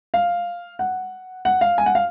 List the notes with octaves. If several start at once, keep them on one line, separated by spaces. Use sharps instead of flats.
F5
F#5
F#5
F5
G#5
F#5
F5